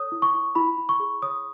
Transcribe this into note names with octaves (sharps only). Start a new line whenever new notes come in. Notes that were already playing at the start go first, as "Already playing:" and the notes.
Already playing: A4 C#5 D#6
E4
C#6
E4
E4 B5
E4
C#6
G#4
C#5 D#6